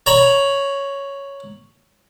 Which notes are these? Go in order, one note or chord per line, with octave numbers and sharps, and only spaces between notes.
C#5 A#5 B5